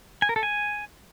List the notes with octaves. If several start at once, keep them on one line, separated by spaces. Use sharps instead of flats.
G#5
A#4
A4
G#5